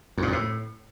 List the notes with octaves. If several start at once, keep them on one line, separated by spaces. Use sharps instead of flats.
F2
A#2
F2
A2